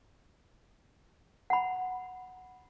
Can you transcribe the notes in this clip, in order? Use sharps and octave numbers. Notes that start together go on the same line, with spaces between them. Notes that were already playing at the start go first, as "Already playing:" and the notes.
F#5 B5